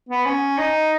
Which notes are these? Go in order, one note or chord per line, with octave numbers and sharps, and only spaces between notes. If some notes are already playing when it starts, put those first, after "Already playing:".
B3
C#4
D#4